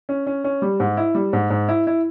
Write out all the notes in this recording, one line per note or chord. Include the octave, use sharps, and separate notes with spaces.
C#4
C#4
C#4
G3
G#2
E4
G3
G#2
G#2
E4
E4